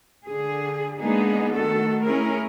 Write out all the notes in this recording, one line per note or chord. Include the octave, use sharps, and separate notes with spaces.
D3 G#4
G#3 A#3 B3 D4 D#4 G#4
D#3 A3 F#4 A4
A3 C#4 E4 G#4 A#4